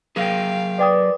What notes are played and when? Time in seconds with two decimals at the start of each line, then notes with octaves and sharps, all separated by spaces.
0.16 F#3 G#4 A#4 F5 G5
0.79 B4 D5 G5 D#6